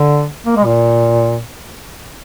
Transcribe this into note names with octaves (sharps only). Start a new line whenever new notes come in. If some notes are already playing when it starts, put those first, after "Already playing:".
Already playing: D3
A#3
G#3
A#2